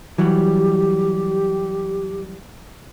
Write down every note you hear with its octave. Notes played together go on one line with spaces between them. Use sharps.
E3 F#3 G3 G4